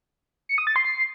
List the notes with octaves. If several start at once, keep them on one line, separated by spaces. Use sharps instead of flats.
C#7
D#6
A6
C6
C7